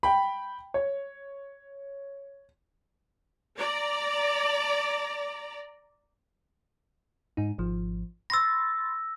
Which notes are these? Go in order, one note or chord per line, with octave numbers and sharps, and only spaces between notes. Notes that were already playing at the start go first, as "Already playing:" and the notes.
G5 B5
C#5
D5 A#5
G#2 D#4
G#1 F3
B5 C6 E6 A6 A#6